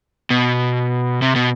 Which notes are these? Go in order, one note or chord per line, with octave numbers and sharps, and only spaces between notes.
B2
C3
B2